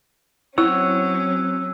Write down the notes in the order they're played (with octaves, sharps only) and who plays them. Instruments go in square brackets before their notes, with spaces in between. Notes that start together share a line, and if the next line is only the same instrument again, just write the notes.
[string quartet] F#3 C#4 [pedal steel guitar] C4 C#5 F#5 [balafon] E4 [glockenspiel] E6